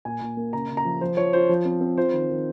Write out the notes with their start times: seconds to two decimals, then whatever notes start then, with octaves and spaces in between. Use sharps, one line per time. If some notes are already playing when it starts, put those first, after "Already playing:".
0.05 A#2 G#5
0.21 A#2
0.37 A#3
0.53 C#3 A#5
0.69 C#3
0.77 A#5
0.85 F3
1.01 F3 C5
1.17 F3 C#5
1.33 F4 C5
1.49 F3
1.65 C4
1.81 C4
1.97 F4 C5
2.13 D#3
2.30 D#3